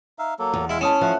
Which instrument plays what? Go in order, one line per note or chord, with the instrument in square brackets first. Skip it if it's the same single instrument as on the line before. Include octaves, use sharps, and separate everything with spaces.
[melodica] D#4 E5 F5
F#3 A#3 A4
[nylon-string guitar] E2
[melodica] G#3 E5 F5 [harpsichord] E4
[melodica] G#3 [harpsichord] C#4 [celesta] A5 D#6 E7
[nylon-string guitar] F3 [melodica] A3 F#5